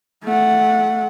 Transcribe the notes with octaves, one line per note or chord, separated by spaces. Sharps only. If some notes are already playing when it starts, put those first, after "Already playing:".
A3 F#5